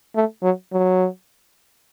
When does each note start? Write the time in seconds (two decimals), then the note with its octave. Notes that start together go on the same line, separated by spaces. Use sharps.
0.15 A3
0.43 F#3
0.72 F#3